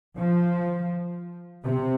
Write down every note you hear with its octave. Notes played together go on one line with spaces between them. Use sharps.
F3
C3